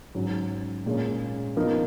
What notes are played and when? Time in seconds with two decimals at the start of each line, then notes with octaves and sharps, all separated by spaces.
0.15 G#2 F#3 C#4
0.86 A#2 G#3 C#4
1.56 F3 B3 D#4 A#4